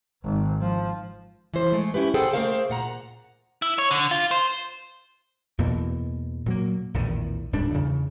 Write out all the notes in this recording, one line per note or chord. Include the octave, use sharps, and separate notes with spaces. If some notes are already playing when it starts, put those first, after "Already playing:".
G#1
F3
E3 C5
G#3 A3
C#4 E4 G4 B4
G#4 A4 C5 F#5 G5
A3 A#3 G#4 A#4 C5 F5
A#2 F#5 A#5
E4
C#5
D3
F4
C5
E2 B2 A#3
A#2 F#3 A#3
A#1 E2 A2 D#3
D1 G#2 G3 D4
E2 C#3